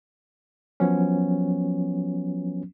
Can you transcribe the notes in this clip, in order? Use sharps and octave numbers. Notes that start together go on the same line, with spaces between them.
F3 F#3 B3 C#4